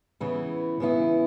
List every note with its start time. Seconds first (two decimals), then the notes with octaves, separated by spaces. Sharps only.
0.20 C#3 E3 B3 E4
0.80 C#3 E3 B3 E4